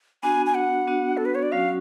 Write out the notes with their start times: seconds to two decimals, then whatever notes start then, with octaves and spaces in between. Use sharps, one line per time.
0.23 B3 D4 F#4 G#5
0.46 G#5
0.55 F#5
0.87 B3 D4 F#4
1.17 A4
1.25 B4
1.35 C#5
1.43 D5
1.52 F#3 C#4 F#4 F5